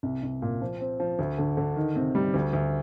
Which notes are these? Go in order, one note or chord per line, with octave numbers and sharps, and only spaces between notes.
C2
C2
A#2
F3
C4
F3
D2
D3
D3
D#3
C3
G3
D2
D2